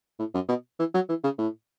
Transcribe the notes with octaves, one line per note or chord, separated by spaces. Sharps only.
A2
F#2
B2
E3
F#3
E3
C#3
A2